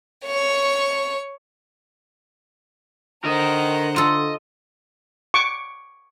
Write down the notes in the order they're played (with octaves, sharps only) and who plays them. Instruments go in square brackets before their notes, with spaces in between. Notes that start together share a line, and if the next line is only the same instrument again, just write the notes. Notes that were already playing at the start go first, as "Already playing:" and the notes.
[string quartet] C#5 C#6
[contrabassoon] D3 [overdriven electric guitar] A#4 D#5 [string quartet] C5 F#5 A#5
[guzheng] F4 A4 [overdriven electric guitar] D#5
[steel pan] C#6 D6